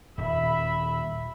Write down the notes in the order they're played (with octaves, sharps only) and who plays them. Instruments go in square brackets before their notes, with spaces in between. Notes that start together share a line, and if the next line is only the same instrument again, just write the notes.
[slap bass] D#1 [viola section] E5 B5